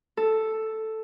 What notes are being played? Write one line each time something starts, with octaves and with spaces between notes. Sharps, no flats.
A4